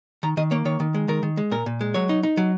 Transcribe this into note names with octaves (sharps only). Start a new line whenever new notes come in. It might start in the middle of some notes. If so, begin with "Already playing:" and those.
D#3 A#5
D#3 D#5
A#3 C#5
D#3 C#5
D#3
G#3
D#3 A#4
D#3
G#3
A#2 A#4
A#2
G#3
F#3 C#5
D#4
D#4
F#3